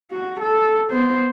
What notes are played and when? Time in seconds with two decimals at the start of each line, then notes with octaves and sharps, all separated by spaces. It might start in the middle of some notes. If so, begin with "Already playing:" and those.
0.11 F#4
0.41 A4
0.91 B3 C5